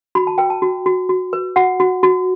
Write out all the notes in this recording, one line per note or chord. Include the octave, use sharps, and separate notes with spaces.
F#4 B5
A5
B4 G5
A5
F#4
F#4
F#4
B4
F#4 F#5
F#4
F#4